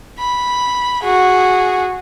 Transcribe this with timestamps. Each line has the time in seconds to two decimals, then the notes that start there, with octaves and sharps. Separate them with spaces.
0.20 B5
1.04 F#4 G#4